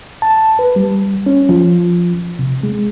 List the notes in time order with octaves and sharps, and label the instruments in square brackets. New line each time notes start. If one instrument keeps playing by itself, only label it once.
[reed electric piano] A5
B4
G3
C#4
F3
C3
G#3